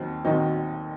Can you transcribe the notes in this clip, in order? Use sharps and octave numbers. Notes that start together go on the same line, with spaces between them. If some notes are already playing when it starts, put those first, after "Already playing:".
Already playing: D#2 D#3 F#3 C4
D#2 D#3 F#3 C4 D#4